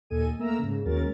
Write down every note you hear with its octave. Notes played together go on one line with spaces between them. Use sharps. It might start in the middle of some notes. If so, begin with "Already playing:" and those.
D#2 A#2 A4 D#5 G#5 D#7
A3 A#3 A#4 E5 A#5 E6
G#2 C#3
D#2 F#3 G#3 C#4 A#4 A6